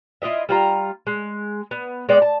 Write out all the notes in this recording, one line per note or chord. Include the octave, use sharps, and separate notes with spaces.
E4 F4 D#5 E5
G3 F4 A#5
G#3
B3
G#3 B3 D5 G5
A5